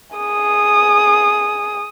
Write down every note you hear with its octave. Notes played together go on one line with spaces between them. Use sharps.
G#4 D#6